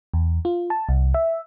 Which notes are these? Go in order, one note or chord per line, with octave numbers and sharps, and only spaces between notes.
E2
F4
A5
C2
E5